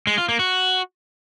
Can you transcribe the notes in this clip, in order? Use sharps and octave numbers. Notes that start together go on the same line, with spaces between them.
G#3
F4
A#3
F#4